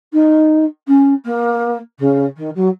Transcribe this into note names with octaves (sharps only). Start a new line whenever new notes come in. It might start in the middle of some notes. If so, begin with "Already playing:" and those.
D#4
C#4
A#3
C#3
D#3
F#3